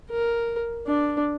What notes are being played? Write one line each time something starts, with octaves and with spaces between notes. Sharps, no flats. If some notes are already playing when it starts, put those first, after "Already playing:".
A#4
D4